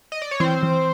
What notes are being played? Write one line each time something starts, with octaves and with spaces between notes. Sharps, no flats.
D#5
D5
C#5
E3 C4 C5
E3